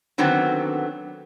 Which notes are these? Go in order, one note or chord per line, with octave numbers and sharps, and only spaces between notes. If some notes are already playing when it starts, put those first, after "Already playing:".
D3 D#3 F#3 B3 C4